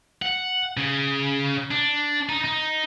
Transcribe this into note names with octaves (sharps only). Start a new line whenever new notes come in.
F#5
C#3
D4
D#4
D#4